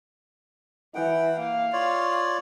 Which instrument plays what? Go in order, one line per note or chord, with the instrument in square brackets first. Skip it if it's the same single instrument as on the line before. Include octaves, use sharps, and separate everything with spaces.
[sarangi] E3 [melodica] F#5 G5
[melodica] A#3 [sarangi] F5
[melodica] F4 C#5 D5